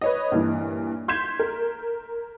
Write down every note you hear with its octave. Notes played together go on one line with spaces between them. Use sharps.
B4 C#5 D#5
G2 A#2 E3
C6 G6 G#6 B6 E7
A#4